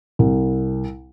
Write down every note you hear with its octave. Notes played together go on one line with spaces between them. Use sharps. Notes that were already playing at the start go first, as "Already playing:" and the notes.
C2